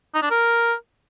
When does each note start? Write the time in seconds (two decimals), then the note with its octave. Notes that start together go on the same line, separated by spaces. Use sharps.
0.14 D#4
0.22 D4
0.31 A#4